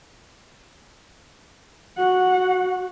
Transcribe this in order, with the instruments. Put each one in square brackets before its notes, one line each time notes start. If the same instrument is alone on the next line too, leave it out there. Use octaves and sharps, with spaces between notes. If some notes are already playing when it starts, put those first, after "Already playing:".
[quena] F#4 [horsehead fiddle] F#5